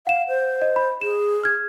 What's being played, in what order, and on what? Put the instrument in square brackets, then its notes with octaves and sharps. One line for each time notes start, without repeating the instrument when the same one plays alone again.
[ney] F5 [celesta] F#5 E7
[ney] C5
[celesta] D#5
B5
[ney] G#4 [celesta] E7
[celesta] F6 G#6